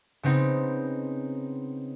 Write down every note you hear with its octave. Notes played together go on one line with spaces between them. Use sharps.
C#3 B3 C4 D#4